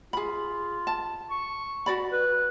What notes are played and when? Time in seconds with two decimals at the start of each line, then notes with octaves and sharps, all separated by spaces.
0.13 F4 G#4 B5
0.87 A5
1.30 C#6
1.86 F#4 D5 B5
2.12 B4